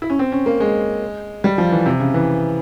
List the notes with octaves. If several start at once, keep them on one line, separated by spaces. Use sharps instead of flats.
E4
C#4
C4
C#4
A#3
G#3
G3
F3
E3
C3
C#3
E3